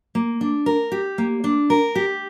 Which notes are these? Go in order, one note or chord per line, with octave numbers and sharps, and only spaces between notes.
A#3
D4
A#4
G4
A#3
D4
A#4
G4